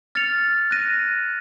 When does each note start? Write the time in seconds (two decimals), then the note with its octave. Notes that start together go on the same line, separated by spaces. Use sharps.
0.15 F6 A6 C#7 F7
0.71 F#6 A#6 D#7